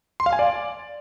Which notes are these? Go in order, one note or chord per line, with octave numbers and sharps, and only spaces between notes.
C6
F5
G#5
D5